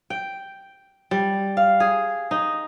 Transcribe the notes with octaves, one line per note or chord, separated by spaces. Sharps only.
G5
G3
F5
G#4
D#4